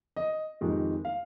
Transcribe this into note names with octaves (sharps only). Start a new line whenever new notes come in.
D#5
F2 C3 D#3 G#3
F5